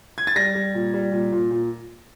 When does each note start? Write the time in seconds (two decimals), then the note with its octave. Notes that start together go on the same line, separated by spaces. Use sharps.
0.18 G#6
0.27 A6
0.36 G3 A#6
0.55 G3
0.74 A#2
0.94 G3
1.12 A#2
1.32 A#2
1.51 A#2